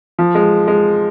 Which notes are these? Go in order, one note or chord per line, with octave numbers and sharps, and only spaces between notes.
F3
G#3
G#3